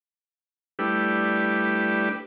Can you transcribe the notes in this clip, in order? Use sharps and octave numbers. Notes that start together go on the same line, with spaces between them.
G3 A3 D4 E4 G4 B4